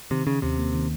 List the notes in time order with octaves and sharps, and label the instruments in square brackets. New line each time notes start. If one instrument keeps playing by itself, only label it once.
[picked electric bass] C3 [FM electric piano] D#3
[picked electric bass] C#3 [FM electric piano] C#4
[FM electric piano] D#2 [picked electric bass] C3
[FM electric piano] A#3
D#3